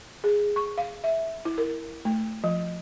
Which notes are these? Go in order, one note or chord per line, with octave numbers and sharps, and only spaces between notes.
G#4
C#6
F5
E5
E4
A#4
A3
F3